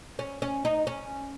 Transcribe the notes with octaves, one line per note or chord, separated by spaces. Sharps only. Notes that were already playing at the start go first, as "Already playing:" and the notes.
C#4
C#4
D#4
C#4